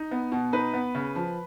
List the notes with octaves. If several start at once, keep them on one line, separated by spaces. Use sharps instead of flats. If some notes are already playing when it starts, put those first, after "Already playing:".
Already playing: D#4
B3
B2
D#4 B4
B3
C#3
F3